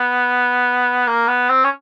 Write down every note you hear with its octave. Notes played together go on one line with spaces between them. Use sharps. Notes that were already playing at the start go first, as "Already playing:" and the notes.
Already playing: B3
A#3
B3
C4
C#4